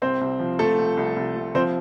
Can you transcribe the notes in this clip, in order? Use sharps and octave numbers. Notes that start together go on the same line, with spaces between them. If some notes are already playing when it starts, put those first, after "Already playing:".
C2 C4 C5
C2
F3
F3 A3 A4
C2
C2
C2
C2
F3 C4 C5